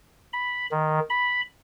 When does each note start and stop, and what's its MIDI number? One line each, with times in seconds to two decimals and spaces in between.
0.33 0.66 83
0.71 1.00 51
1.10 1.41 83